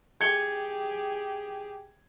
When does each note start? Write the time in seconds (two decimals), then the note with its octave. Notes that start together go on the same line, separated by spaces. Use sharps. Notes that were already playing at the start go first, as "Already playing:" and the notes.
0.21 G4 G#4 G#6 C#7 G7